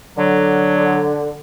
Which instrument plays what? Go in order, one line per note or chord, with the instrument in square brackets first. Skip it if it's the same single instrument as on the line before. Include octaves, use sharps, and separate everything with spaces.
[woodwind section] D3 [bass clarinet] F#3